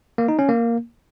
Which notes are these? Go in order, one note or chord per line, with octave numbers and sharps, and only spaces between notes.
A#3
D#4
C#4
A#3